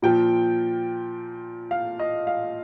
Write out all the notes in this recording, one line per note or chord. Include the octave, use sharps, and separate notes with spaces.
A#2 F3 G5
F5
D#5
F5